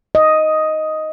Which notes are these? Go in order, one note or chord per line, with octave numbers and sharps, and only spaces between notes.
D#5